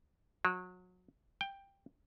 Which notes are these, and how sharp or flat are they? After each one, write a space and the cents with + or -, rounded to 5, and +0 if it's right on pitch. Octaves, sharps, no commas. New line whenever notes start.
F#3 -30
G5 +10